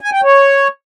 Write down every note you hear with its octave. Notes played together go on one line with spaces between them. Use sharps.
G#5
G5
C#5